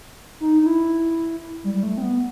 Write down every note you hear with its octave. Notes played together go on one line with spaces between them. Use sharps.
D#4
D#4
E4
G3
G3
A3
C4
B3